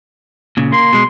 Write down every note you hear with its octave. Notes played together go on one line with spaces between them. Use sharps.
A#2 C#3
A#3 C6
B2 G#3